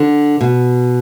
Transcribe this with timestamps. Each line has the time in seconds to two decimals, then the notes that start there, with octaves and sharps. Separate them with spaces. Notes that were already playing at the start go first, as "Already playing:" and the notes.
Already playing: D3
0.41 B2